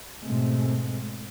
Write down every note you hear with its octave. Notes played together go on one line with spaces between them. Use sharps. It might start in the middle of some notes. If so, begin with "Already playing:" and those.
G#2 B2 G#3 A3 C4